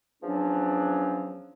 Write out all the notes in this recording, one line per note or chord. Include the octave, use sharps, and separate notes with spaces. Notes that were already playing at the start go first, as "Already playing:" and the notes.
E2 F3 F#3 C#4 D4